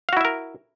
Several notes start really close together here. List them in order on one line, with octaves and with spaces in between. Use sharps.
F5 F#4 E4 E5 A#4